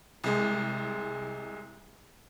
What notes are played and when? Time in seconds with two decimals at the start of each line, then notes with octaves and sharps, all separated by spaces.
0.24 C2 G#3